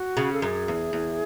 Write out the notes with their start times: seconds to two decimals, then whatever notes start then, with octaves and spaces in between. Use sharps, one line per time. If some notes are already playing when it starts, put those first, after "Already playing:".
Already playing: F#4
0.17 C#3
0.33 A4
0.42 F#2 G#4
0.68 E2
0.93 E2